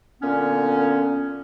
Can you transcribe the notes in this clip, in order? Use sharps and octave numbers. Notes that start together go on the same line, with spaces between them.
A#2 D3 B3 C#4